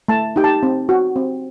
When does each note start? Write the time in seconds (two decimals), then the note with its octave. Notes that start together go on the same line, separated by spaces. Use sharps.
0.08 A3 A5
0.36 D#4 G4 G5
0.44 A5
0.63 C4
0.89 F#4
1.16 C4